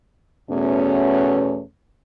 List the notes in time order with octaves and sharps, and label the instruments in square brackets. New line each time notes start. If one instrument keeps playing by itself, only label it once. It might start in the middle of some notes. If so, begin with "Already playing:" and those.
[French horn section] E2 B2 A3 C#4